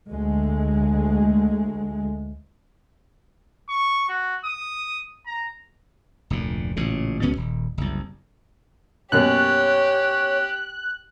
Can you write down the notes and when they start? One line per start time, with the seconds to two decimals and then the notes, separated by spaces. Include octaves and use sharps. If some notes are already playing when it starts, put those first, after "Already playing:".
0.11 D2 G#3
3.69 C#6
4.09 F#4
4.45 D#6
5.26 A#5
6.30 F1 D2 A#2
6.76 A1 A#2 C#3
7.22 C#2 B2 B3 C#4
7.37 D#1
7.78 F#1 C2
9.12 F#2 B2 A#3 G4 C#5 F#6